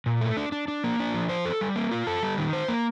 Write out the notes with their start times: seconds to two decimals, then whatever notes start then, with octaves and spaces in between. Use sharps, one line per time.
0.06 A#2
0.21 A3
0.37 D4
0.52 D4
0.68 D4
0.84 A#3
0.99 D4
1.14 F3
1.29 C5
1.45 A4
1.61 G3
1.76 A#3
1.91 F4
2.07 A4
2.23 G3
2.38 D#3
2.53 C5
2.68 A#3